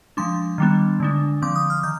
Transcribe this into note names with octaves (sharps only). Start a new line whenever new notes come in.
F3 G#3 D4 C6
D#3 G3 B3 D4
D3 G#3 D4
D3 F3 C4 D6
D#6
F6
D#3 G6